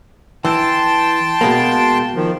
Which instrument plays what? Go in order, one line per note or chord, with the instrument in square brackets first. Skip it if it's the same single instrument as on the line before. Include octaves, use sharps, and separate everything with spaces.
[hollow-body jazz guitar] E3 [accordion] G5 A5 C6
[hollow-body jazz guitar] B2 G#3 A#3
[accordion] D#3 F3